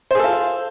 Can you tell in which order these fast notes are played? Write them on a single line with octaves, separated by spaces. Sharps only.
C5 G#4 A4 F4